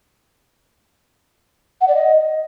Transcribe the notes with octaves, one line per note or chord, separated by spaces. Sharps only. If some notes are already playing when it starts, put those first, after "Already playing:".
F#5
D5
D#5